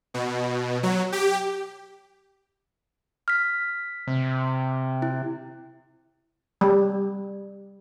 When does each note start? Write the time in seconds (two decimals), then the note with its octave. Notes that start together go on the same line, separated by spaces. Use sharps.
0.14 B2
0.83 F#3
1.12 G4
3.28 F6 B6
4.07 C3
5.02 E4
6.61 G3